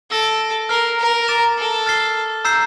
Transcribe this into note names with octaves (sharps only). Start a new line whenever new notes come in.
A4 E6 A#6 D7
A#4 F6 C7 G7
A#4
D6 A6 E7
A4
F6 A6 C7 G7
A#5 E6 G6 C7 E7